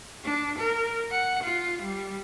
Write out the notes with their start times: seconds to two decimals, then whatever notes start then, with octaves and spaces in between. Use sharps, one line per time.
0.24 D4
0.59 A#4
1.12 F#5
1.44 F4
1.83 G3